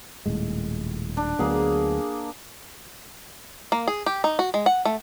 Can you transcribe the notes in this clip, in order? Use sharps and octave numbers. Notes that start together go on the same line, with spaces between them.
D#1 A2 G#3
D4
D2 F#3 A#3 B3 G#4
A#3
G#4
G4
D#4
F#4
G#3
F#5
A3